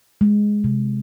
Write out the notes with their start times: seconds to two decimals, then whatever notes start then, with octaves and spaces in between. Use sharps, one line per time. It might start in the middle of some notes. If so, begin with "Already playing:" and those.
0.21 G#3
0.64 C3